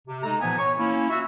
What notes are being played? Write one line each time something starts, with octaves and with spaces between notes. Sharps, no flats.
C3
G#3 A3 D#4 A4 A#5
A#2 E3 F3 B3 G#5
C#5 C#6
A#3 C#4 E4
F4 F#4 E5